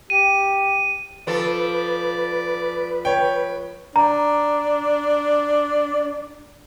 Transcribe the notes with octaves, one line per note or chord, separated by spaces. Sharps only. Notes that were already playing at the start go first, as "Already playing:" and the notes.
G4 D#7
F3 A4 B4 D5
C#5 G5
D4 A#5